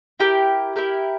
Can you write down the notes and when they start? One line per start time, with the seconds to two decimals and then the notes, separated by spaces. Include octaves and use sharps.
0.20 E4 G4 A#4
0.76 E4 G4 A#4